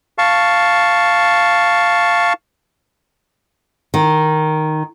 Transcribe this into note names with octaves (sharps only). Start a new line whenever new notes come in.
F5 A5 C#6
D#3